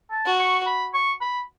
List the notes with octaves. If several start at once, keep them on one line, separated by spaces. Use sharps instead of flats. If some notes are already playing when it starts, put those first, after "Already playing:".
A5
F#4
C#6
B5
C#6
B5